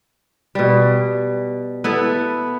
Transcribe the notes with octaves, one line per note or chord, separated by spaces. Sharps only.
B2 G3
B3 E4 A4